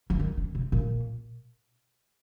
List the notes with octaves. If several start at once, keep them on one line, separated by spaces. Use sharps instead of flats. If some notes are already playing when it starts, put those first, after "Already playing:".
F3
D#3
D3
C3
A#2